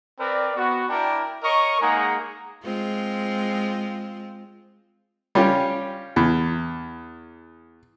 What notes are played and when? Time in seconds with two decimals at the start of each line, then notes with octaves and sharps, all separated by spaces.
0.19 C4 A#4 B4 D5
0.56 B3 F#4
0.89 D4 E4 A#4 D5 G5
1.44 A#4 C#5 D#5 C#6
1.81 G#3 A#3 D#4 G#4 F#5 A#5
2.64 G#3 C4 F4
5.35 G3 C#4 F4 G4
6.16 E2